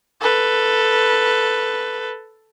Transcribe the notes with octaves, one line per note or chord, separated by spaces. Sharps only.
A4 B4